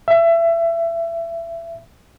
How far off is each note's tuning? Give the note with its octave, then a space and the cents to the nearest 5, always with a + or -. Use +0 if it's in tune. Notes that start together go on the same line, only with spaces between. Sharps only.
E5 +25